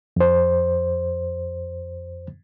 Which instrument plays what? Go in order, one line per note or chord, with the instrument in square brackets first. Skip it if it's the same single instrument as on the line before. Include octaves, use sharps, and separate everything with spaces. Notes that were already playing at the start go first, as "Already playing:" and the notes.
[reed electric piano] F2 C5